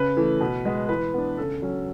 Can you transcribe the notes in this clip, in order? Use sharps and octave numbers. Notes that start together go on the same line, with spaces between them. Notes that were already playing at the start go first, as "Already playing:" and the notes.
Already playing: C#3 B4
E3 A3
B2
G#3 B3
E3 B4
B3 D4
C#3 A4
F#3 C#4